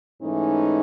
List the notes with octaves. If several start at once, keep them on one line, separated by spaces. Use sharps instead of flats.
G#2 E3 A3 C#4 D#4